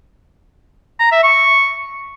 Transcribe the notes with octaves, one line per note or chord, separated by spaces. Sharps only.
A#5
E5
C#6